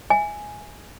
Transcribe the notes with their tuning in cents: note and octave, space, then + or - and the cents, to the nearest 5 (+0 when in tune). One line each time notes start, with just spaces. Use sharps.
E5 -10 G#5 +0